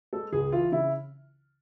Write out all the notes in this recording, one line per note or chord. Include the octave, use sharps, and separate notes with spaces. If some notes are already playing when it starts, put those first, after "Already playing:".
G#3 A4
C#2 G#4
E3 F4
C#3 E4